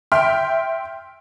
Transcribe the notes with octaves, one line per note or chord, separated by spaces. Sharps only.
E5 G5 C6 F6